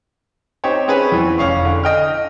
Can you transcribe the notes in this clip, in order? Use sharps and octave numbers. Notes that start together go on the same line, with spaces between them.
C4 D#4 G4 C#5
C4 C#4 G#4 B4
E2 E3
F1 C#4 F5 C#6
D3
D#5 G5 F6